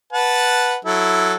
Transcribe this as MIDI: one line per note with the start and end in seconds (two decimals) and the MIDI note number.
0.13 0.76 71
0.13 0.76 78
0.13 0.76 81
0.85 1.36 54
0.85 1.36 64
0.85 1.36 69